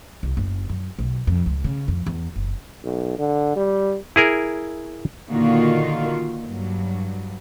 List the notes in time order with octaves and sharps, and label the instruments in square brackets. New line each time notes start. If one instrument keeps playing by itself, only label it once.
[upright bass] C2
F#1
F#2
B1
F2
C#2
C#3
F2
E2
F#1
[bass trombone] B1
D3
G3
[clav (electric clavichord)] E4 G#4 A#4
[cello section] A#2 D3 D#3 A#3 F4 F#4
G2 F#3